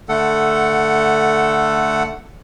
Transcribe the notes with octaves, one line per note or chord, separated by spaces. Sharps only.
D3 A3 A4 F#5